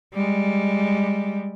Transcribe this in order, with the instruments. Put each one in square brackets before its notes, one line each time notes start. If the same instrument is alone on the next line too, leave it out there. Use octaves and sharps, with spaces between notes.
[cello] G3 G#3